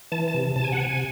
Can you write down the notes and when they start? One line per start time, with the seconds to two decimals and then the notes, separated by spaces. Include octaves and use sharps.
0.12 E3 A5
0.28 A5
0.34 C3
0.56 C3 A5
0.64 G#5
0.72 F#5
0.78 C3 G#5